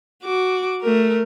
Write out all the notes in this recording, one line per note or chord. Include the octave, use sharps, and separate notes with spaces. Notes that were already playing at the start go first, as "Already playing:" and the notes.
F#4 D6
A3 A#4